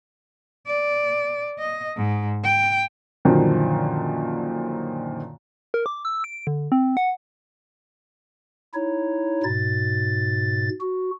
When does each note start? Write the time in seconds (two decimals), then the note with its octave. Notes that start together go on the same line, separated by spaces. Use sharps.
0.67 D5
1.59 D#5
1.97 G#2
2.44 G5
3.25 F#2 A#2 D3 D#3 F3 F#3
5.74 A#4
5.86 D6
6.05 E6
6.24 D7
6.47 D3
6.72 C4
6.97 F#5
8.74 D#4 E4 C#5
9.43 G#2 B2 A6
10.80 F#4